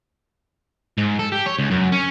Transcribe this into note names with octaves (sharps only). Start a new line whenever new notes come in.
G#2
A4
G4
C#5
C#2
F#2
C#4